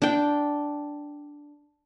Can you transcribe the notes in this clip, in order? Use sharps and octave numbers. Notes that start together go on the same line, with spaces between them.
D4 G5